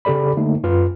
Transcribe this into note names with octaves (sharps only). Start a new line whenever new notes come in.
C#3 G4 A4 D5 B5
D3 A3 A#3 D#4
F#2 F4 B4 F6